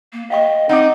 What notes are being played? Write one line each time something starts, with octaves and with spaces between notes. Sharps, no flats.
A#3
D#5 F5 G5 C#6
C4 D#4 F#5 D6